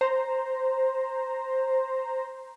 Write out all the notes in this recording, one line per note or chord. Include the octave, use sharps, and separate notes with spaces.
C5 A#5